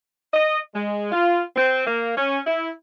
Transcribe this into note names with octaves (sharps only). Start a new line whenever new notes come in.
D#5
G#3
F4
C4
A#3
C#4
E4